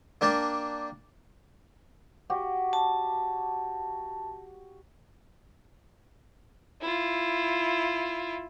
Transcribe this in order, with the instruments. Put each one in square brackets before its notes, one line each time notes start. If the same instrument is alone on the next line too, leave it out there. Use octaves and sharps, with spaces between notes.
[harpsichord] A#3 D4 A#4 G5 A5
[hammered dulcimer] F#4 G4
[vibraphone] A5
[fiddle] E4 F4